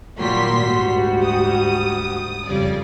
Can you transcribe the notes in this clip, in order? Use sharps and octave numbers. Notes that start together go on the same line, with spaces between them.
A#2 D#3 F#3 G3 C6 B6
D2 G#2 G3 F#4 G4
D#6
F2 C#3 G3 D5